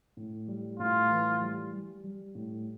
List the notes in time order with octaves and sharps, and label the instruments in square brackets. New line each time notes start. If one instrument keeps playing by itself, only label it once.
[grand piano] A2
G3
[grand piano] A2 [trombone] F4
[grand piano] E3
G3
G3
G3
A2